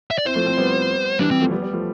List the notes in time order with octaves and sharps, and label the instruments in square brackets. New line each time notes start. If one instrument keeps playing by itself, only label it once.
[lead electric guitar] E5
D5
[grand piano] C4 E4 [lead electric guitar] C5
[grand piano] F3 A3
A3 C4
G3 B3
[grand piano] E3 G3 [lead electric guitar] D4
[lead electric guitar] C4
[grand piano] F3 A3
G3 B3
G3 B3
F3 A3